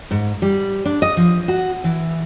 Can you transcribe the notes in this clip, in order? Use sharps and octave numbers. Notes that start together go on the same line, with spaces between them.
G#2
G3
D4
D#5
F3
F#4
E3